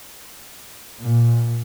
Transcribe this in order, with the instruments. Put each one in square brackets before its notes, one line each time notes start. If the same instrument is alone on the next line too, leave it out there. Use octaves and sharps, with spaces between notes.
[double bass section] A#2